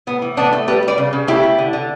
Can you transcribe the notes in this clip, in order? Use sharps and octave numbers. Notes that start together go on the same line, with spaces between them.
A2 B3
E3
A2 B3 D4
A3
G3 G4 B4
G3
B4 D5
C#3
C#3
A3 E4 G4
A3
D3
D3